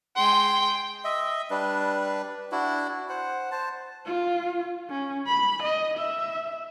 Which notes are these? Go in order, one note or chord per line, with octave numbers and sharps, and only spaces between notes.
G#3 G5 C6
D#5 E5
G3 D4 B4
D4 E4 F#4
C5 F#5
C5 A5
F4
C#4
B5
D#5
E5